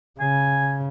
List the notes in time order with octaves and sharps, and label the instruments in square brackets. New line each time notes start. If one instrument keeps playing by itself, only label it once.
[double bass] C#3 [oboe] G#5